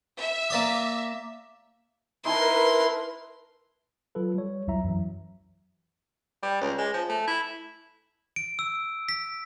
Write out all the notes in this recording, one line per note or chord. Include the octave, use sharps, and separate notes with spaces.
E5
A#3 D5 D#6
D#4 E4 A#4 B4 G#5 A5 C6
F#3 F4 A4 B4
G3 C#5
C2 F2 F#3 E4 E5 A#5
F#2 E3 F#3
G3
C#2
G#3
F3
A3
E4
D7
E6
B6